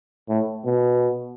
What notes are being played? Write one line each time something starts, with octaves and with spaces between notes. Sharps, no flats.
A2
B2